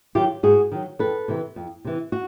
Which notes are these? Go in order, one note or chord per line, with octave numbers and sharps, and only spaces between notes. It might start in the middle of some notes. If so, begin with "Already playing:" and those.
D#3 F#3 F4 G4
G#2 F#4 G#4
D#3 F#3
F2 A4 B4
C3 E3
F2
C3 E3
F#4